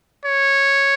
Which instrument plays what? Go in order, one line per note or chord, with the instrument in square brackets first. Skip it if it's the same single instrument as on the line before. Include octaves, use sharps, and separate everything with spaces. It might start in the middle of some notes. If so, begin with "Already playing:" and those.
[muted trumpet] C#5